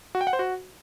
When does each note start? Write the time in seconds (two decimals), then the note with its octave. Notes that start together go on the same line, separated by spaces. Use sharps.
0.15 F#4
0.21 G5
0.27 F#5
0.33 C5
0.39 F#4